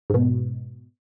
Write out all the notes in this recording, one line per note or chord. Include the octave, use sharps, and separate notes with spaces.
G#2 B2